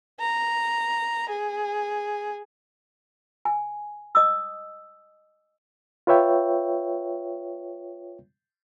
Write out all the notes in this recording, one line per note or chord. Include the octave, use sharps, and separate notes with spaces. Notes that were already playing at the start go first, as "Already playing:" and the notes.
A#5
G#4
G#5
D#5 D#6 E6
F4 B4 C#5 E5 G5